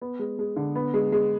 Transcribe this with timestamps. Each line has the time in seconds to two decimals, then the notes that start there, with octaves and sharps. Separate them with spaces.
0.02 B3
0.19 G#3
0.39 G#3
0.56 D3
0.76 B3
0.94 G#3
1.12 G#3